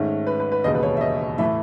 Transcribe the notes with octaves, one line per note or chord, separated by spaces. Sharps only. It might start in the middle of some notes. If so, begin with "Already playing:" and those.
Already playing: G#2 D#3 A3 C#4
B4
B4
B4
E1 D#2 C#3 D#5
B4
C#5
E5
D#5
A2 E3 A3 E5